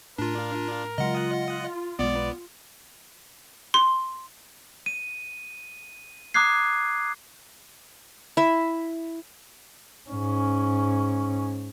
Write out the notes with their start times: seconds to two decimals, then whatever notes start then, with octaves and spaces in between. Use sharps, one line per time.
0.18 A2 D4 F4 A#4
0.98 C#3 F#3 G#3 F4 D#5 F#5
1.99 B1 G#3 B3 D5
3.74 C6
4.86 D#7
6.34 A#5 D6 D#6 F#6 G#6 C7
8.37 E4 E5
10.09 G#2 C#4